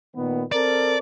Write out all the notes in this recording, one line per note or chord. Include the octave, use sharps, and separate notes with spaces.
A#2 D#3 B3
C4 A4 A#4 D5